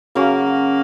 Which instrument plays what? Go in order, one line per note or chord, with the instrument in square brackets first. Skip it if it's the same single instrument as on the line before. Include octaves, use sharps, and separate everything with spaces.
[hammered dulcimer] C#3 F#3 C#4 [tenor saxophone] A#3